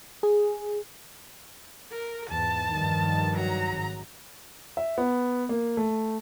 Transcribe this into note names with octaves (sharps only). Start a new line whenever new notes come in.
G#4
A#4
E2 G#2 A5
G2 D#3 F3
F#3 A#5
G#1
E5
B3
A#3
A3